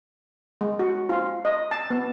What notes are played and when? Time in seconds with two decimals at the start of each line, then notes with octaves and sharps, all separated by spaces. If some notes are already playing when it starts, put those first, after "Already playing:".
0.61 G#3
0.79 F#4
1.09 F4
1.45 D#5
1.71 A5
1.90 B3